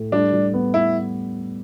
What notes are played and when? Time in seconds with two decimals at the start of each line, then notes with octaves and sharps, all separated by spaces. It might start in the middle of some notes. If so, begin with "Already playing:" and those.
Already playing: A2
0.12 G3 D4
0.33 G3
0.54 B3
0.74 B3 E4